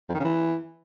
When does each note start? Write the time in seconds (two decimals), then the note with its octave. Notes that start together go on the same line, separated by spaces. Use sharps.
0.09 F2
0.14 D#3
0.20 C#3
0.25 E3